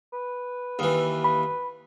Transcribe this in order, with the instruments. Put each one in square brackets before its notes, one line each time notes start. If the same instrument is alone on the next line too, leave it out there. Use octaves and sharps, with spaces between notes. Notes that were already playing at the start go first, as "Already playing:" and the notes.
[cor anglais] B4
[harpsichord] D#2 E3
[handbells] B5